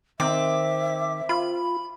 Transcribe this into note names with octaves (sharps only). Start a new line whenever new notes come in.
D#3 C4 E5 D6
F4 B5